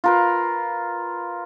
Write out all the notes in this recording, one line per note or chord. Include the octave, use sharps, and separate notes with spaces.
F4 A#4 B4